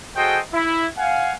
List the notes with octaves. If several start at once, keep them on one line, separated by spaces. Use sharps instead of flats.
F#4 G#4 A4 C5 D#5 G5
E4
F5 F#5 G#5